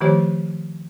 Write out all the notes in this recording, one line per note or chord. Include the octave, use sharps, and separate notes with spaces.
D#3 F3 A3 G4 C5 C#5